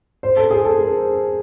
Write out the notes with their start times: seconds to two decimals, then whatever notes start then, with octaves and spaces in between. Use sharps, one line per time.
0.23 C5
0.37 A4
0.51 G#4
0.65 A4
0.78 A#4